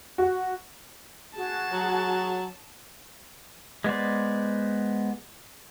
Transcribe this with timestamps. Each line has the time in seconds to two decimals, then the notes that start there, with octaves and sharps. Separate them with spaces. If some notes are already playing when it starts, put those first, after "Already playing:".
0.18 F#4
1.36 F#4 G#4 A5
1.72 F#3
3.84 G#3 B3 C5 D5